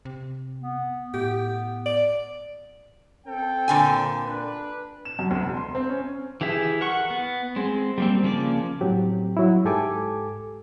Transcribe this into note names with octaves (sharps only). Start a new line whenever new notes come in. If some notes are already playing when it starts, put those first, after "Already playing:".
C3
B3
A2 B3 G4
D5
C4 A4 G5
A#2 D3 G#5
D4 B4
E7
F#2
D2
E1
C6
C4
C#4
E3 G4 G#4 E5
A#4 F#5 C#6
B3
G#3 C4
G3 A#3 C4
C#3 F3 A#3 D5
A2 F#3 C4 G4
F#3 E4
G#2 G4 A4 G#5 D6